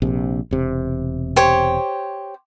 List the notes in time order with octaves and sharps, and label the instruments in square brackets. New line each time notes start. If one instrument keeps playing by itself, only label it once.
[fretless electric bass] A#1 C3
E1 C3
[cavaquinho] G4 C5 C#5